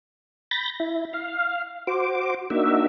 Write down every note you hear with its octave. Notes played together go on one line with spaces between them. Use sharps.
B5 G6 A6 A#6
E4
F5
F#4 C5 D6
A#3 D4 D#4 F#4 E5